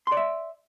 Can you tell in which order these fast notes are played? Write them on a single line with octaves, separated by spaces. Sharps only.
C6 D5 E5